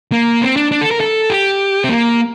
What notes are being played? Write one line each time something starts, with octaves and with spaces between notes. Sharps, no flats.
A#3
C4
D4
D4
A4
A#4
A4
G4
C4
A#3